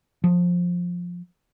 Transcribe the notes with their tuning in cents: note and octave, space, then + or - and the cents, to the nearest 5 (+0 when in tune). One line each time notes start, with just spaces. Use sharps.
F3 +15